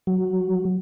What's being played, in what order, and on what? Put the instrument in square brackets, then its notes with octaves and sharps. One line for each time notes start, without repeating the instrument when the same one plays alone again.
[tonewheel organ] F#3